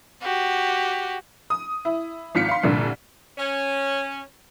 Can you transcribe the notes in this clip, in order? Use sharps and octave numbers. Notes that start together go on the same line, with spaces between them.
F#4 G4
D#6
E4
G#1 F4 B6 C#7
F5 C6
C2 G2 A#2 D3
C#4